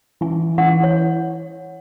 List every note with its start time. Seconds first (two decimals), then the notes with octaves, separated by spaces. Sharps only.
0.21 E3 G#5
0.58 E3 F#5
0.83 C#5